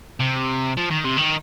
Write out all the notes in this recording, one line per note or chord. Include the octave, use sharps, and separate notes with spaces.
C3
F3
D#3
C3
D#3